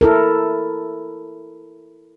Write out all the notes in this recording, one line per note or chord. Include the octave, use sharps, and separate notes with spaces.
E4 A4 A#4